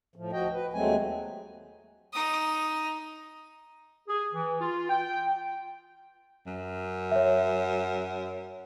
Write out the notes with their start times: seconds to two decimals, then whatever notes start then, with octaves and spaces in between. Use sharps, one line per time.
0.16 A2 F3
0.33 D2 F3 F#4 D#5 G5
0.52 B4
0.73 D#2 F#3 G#3 A3 C4 G#5
2.13 D#4 D#6
4.08 G#4
4.33 E3
4.61 F4
4.90 G5
6.47 F#2
7.12 C#5 E5